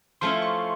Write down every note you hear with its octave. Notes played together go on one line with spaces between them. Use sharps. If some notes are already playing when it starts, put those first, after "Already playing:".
F3 A3 C#4 E4 C6
C#6